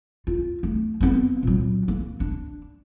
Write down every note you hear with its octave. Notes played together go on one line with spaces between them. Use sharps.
F4
A3
B3 C4
A#2 F#3
A#3
D4